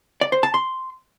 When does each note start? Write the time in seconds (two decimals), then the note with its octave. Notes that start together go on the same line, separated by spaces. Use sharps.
0.21 D5
0.32 C5
0.43 A5
0.54 C6